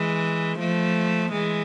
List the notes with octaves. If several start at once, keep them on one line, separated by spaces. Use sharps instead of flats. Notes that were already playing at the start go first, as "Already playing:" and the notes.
Already playing: E3 G#3
F3 A3
E3 G#3